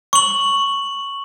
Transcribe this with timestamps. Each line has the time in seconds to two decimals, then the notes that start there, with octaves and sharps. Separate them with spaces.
0.13 C#6 F#7